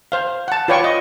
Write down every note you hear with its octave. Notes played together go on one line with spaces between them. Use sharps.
C5 F5
F#5 A5
F4 B4 C#5 D5 G5 C#6
D#5